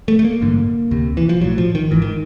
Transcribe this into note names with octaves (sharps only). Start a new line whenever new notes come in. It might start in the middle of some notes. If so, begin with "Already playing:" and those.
A3
A3
A#3
A1 G2 D3
D2 C3
E3
F3
B1 A2 F#3
F3
D#3
G#1 G#2 E3
D#3